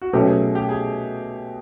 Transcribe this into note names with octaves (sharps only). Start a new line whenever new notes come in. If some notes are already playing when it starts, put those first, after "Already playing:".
F#4
B2 F#3 A3 C#4 G4
G#4
G4
G#4